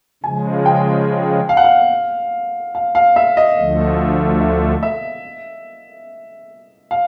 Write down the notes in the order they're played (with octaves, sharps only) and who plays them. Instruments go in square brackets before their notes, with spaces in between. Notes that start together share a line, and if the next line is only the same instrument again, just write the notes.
[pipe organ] C#3 F3 G#3 [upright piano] G#5
[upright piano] G5
F5
F#5
F5
F5
F5
E5
D#5
[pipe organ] D2 D3 F3 A3
[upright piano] E5
E5
F5